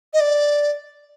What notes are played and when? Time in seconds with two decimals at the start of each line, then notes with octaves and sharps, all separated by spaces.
0.14 D#5
0.20 D5